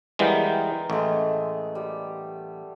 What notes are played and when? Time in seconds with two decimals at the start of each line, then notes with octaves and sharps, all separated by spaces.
0.19 E3 G3 G#3 B3 A#4 G5
0.90 A1 G#3 A3
1.75 G3